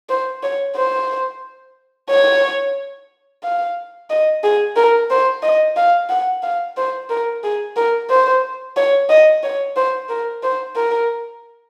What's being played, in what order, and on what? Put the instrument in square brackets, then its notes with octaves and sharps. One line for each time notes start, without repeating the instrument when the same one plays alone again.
[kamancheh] C5
C#5
C5
C#5
F5
D#5
G#4
A#4
C5
D#5
F5
F#5
F5
C5
A#4
G#4
A#4
C5
C#5
D#5
C#5
C5
A#4
C5
A#4